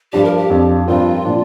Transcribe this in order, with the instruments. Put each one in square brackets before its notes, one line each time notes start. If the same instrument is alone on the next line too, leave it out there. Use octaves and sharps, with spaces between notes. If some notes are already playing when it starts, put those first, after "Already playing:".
[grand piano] G2 F3 D4 [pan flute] G4
[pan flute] A#4
G4
[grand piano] F2 F3 D4
[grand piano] G2 F3 C4 A#4 [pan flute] F4
[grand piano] A#2 F3 D4